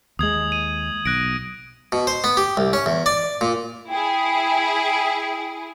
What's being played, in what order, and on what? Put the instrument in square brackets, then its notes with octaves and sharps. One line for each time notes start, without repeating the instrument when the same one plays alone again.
[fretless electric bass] D#2 G#3 [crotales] D#6 G#6 F#7
[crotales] D#7
[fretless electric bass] B1 [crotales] F#6 A#6 D7
[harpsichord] B2
C5
B3
G4
C2
C#4
E2
D5
A#2
[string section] E4 G#4 [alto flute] G5